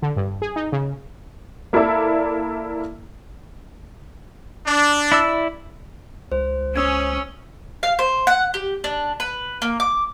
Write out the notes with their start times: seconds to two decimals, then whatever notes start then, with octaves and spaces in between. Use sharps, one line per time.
0.02 D3
0.17 G2
0.42 G#4
0.56 D#4
0.72 C#3
1.73 A#3 E4 A4 D5 E5
4.65 D4
5.12 E4 D5 E6
6.32 C#2 C5
6.76 C#4 D#6 E6 G#6
7.83 F5
7.99 C5
8.27 F#5
8.54 G4
8.84 D4
9.20 B4
9.62 A#3
9.80 D6